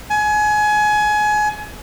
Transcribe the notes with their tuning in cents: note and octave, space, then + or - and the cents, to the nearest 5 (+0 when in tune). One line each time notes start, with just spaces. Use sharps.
G#5 +25